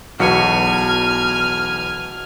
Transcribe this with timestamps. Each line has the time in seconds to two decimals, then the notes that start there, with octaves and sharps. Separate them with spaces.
0.20 B1 E2 F#4 B4 G#5 A5 F6 C#7